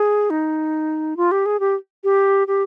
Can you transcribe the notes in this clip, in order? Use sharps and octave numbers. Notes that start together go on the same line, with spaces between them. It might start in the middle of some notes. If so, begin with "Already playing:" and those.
Already playing: G#4
D#4
F4
G4
G#4
G4
G4
G4